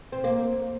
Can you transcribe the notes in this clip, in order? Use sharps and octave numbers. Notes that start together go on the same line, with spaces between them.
C4
A#3